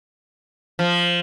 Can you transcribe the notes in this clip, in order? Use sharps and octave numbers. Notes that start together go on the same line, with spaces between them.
F3